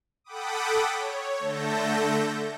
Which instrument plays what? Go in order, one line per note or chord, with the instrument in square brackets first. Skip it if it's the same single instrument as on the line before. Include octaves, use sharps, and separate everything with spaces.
[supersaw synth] A4 F#5 G5 B5 D6 D#6
C#5
D3 A3 A4 G6 A#6